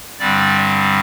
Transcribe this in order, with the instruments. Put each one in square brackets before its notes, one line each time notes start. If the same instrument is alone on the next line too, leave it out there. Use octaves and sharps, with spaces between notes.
[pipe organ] G2 D3 G3 C4 D5